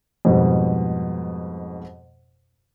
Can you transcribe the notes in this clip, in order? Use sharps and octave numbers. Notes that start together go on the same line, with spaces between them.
F2 G#2 B2 G3